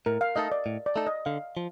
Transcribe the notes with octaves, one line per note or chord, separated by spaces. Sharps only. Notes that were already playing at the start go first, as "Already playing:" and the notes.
A2 A#4
F5
A3 D#4 A4 D#5
D5
A2
D5
A3 D#4 A4
D#5
D3 F5
F3